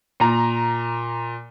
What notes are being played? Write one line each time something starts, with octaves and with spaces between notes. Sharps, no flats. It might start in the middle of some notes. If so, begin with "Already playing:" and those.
A#2 A#5